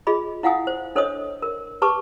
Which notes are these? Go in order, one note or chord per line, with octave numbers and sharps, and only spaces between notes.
F4 G#4 D#5 B5
E4 F5 F#5 G#5 D#6
C5
D4 A4 C5 C#5 D#5 D#6
A#4
G4 B4 A5 C#6 D6